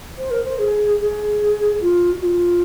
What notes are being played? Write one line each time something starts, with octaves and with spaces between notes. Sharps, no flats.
C5
A#4
C5
G#4
G#4
F4
F#4
F4